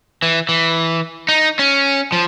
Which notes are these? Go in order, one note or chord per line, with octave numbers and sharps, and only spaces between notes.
E3
E3
D#4
C#4
F3